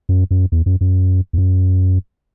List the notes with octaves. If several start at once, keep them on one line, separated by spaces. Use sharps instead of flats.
F#2
F#2
E2
F#2
F#2
E2
F#2